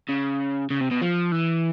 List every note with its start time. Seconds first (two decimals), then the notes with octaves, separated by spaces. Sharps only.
0.09 C#3
0.70 C#3
0.81 C3
0.91 B2
1.01 F3
1.32 E3